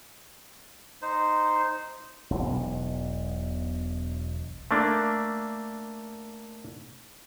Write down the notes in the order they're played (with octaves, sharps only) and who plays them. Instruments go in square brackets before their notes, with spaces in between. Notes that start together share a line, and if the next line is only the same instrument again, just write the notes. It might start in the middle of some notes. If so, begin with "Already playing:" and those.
[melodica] D#4 C5
[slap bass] E1 B1
[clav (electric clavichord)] A3 A#3 D4